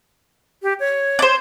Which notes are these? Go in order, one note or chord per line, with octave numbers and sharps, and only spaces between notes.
G4
C#5
C5 D5